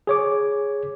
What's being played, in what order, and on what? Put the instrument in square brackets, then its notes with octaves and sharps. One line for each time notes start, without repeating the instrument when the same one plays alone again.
[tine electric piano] G#4 C#5 D6